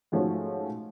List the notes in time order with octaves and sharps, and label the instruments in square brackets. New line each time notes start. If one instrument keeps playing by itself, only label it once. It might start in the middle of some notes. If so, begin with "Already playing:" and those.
[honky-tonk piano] G#2 F3 A3 C#4 F#4